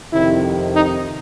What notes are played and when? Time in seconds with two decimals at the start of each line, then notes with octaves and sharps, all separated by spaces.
0.13 F2 C3 D#3 E4
0.73 D#4